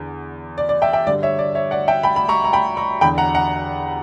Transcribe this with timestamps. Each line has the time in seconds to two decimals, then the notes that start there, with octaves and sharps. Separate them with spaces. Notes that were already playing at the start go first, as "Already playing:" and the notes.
Already playing: E2 D3
0.58 D5
0.69 D5
0.82 E5 G5
0.93 E5 G5
1.07 G2 D3 D5
1.22 C#5 E5
1.39 D5
1.55 C#5 E5
1.71 D5 F#5
1.88 E5 G5
2.03 G5 B5
2.16 B5
2.29 A#5 C#6
2.44 A#5
2.53 G5 B5
2.77 A#5 C#6
3.01 E2 D3 G5 B5
3.18 F#5 A#5
3.34 F#5 A#5